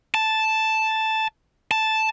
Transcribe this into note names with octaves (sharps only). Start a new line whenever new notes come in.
A5
A5